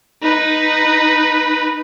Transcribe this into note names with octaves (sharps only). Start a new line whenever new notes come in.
D#4 B4